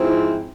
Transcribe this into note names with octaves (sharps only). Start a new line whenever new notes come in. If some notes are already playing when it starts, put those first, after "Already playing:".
Already playing: G#2 F3 C4 E4